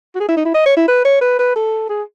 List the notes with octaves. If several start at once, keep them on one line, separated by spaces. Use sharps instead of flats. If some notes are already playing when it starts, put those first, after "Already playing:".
F#4
G#4
E4
D#4
E4
D#5
C#5
E4
B4
C#5
B4
B4
A4
G#4